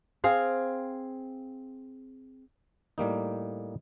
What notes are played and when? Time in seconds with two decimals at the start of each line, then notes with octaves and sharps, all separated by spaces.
0.24 C4 G#4 F5
2.98 A2 G3 A#3 D#4